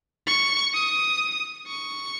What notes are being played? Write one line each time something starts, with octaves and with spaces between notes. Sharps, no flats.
C#6
D#6
C#6